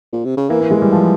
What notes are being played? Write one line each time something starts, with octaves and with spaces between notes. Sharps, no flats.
A#2
C3
C#3
E3 A#3
A#3
G#3
G3
F3